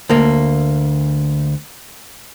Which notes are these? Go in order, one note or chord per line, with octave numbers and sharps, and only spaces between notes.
D2 A#3